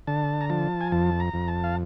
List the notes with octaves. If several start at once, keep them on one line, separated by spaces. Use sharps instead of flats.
D3 A5
A#5
F3 A5
G#5
F2 A5
A#5
F2
A5
F5